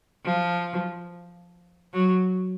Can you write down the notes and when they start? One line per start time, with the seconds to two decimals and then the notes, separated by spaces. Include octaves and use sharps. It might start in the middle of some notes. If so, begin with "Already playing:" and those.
0.25 F3
1.93 F#3